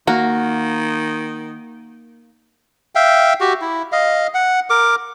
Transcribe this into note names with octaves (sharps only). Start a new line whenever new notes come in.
D#3 A#3 F#4
E5 F5 G5
F#4 G4
E4
D#5 F5
F#5
A#4 D6